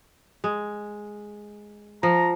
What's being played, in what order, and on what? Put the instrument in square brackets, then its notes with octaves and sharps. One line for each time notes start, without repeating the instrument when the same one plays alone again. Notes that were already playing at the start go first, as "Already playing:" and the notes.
[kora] G#3
[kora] F3 [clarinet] A#5